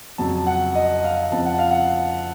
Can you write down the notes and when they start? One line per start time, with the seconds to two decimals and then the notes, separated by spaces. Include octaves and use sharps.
0.18 F2 C#3 F#3 A5
0.47 F#5
0.75 D#5
1.04 F5
1.31 F2 C#3 F3 A5
1.45 F#5
1.59 F5
1.71 F#5